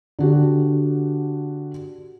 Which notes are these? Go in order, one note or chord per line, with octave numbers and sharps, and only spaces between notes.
D3 F#4 G4